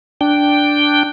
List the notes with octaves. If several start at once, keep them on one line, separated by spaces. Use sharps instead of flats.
D4 G5